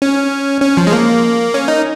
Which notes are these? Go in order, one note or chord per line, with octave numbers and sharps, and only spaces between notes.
C#4
C#4
F3
G#3
A#3
C#4
D#4